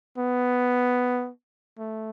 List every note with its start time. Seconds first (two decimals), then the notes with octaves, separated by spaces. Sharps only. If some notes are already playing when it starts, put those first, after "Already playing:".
0.18 B3
1.78 A3